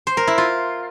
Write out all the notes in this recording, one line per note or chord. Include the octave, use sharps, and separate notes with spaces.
C5
A#4
E4
F4